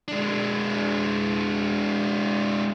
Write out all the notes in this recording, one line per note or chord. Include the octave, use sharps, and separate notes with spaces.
G#3 D4